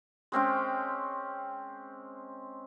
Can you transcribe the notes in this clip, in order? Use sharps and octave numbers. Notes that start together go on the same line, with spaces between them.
G#3 C4 C#4 G5